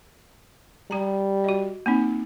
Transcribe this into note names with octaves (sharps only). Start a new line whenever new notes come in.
G3 G4 A#5
F#4 D#5
A#3 C4 D#4